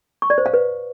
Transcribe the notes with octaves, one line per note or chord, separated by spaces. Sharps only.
C#6
D5
C5
F5
B4